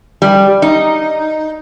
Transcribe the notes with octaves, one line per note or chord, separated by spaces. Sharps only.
G3
D#4